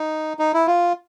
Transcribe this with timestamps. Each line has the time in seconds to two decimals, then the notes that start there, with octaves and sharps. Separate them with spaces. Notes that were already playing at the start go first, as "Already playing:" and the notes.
Already playing: D#4
0.39 D#4
0.54 E4
0.67 F4